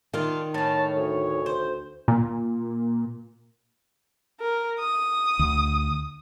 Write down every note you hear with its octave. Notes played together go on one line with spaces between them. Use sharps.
D#3 D4 F4
A2 C#4 A5
D2 C#5
C5
A#2
A#4
D#6
D2